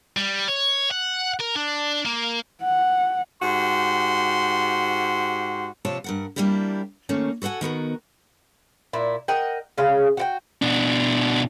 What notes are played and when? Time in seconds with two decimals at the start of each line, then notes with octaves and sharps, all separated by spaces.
0.17 G3
0.48 C#5
0.91 F#5
1.40 A#4
1.55 D4
2.06 A#3
2.63 F#5
3.43 G#2 F#4 G4 C6
5.85 F2 C3 F4 C#5 A5
6.04 G2 A#4 F#5
6.36 G3 A#3 D4 E4 G4
7.09 D#3 A3 A#3 C#4
7.42 F#4 A4 C5 F#5 G#5
7.61 D#3 B3 F#4 A#4
8.93 A#2 E4
9.28 A#4 D#5 F#5 G5
9.78 C#3 G#3 C#4 F5
10.17 F#4 G4 G5
10.62 B2 D4